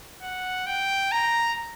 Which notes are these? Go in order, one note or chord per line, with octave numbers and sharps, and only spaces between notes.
F#5
G5
A#5